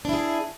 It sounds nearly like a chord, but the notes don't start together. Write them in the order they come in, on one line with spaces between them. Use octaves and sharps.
D4 E4 G#4